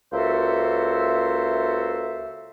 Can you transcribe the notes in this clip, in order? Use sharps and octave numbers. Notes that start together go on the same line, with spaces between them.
C#2 A#3 F#4 A4 C5 E5